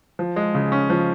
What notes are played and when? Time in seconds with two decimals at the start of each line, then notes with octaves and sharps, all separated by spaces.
0.19 F3
0.36 G#3
0.55 C#3
0.72 C#4
0.90 F3